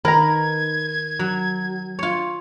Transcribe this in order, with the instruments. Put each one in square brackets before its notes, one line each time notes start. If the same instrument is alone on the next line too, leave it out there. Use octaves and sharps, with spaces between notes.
[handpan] D#3 [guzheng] A#4 [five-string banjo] B4 A#5 [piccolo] G#6
[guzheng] F#3
F4 C#5